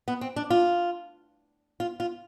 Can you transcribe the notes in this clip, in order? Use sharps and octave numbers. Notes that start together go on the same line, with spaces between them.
B3
C4
D4
F4
F4
F4